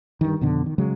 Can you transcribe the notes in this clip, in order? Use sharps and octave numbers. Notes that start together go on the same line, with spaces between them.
G2 D#3
F2 B2 D3
D#3
C#3 F#3 G#3